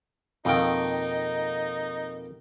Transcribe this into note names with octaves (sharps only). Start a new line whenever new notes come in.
F2 B2 D#3 A#3 D#4 G5